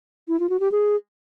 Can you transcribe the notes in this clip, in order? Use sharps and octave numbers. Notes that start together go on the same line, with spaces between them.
E4
F4
F#4
G4
G#4